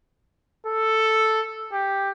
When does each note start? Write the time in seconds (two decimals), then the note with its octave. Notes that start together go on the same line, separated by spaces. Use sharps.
0.67 A4
1.73 G4